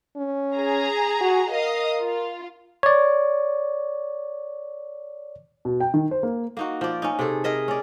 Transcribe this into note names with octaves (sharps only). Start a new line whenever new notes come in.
C#4
G#4 A#5
F#4
A#4 D#5 F5 D#6
F4
C#5 D5
B2
G5
D#3
C5
A#3
A#3 D#4 F#4
F3 D5
C#4 D#4
C3 G#4 A4
G#4 A#4 D#5 E5
C#4 D5